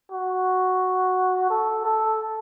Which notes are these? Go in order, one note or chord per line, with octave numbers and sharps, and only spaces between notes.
F#4
A4
A4